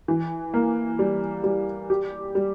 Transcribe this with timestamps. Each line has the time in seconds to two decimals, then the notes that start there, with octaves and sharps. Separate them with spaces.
0.08 E3
0.54 A#3
0.99 G3
1.44 G3
1.90 G4
2.35 G3